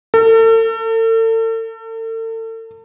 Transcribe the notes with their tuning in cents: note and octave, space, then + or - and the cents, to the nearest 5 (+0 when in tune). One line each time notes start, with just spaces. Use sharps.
A4 +40